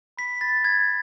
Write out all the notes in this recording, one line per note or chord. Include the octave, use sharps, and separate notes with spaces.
B5 B6
B5 A6
B5 G#6